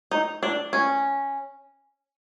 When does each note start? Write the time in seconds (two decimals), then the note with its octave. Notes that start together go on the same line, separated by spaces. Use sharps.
0.11 D#4
0.43 D4
0.73 C#4